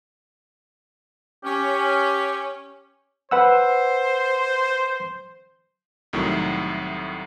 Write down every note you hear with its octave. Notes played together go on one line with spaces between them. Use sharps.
C#4 G4
B4 C5 F#5 E6
C2 A2 D#3 F#3